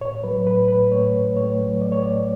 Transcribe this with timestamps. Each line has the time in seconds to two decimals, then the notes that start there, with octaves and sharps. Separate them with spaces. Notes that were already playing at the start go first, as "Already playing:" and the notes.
0.01 A2 C#5
0.24 F#3 B4
0.46 A2 B4
0.68 A2 B4
0.91 A3 C#5
1.14 A2
1.36 A3 C#5
1.59 F#3
1.81 A3 D5
1.92 C#5
2.02 A2 D5